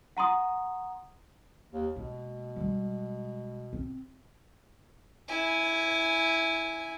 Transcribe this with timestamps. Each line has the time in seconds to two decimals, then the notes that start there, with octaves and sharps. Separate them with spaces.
0.17 F#5 A#5 C6 D#6
1.72 D#2
1.96 B2 G#3 A#3
2.56 G3 G#3
3.73 C4
5.28 E4 G#5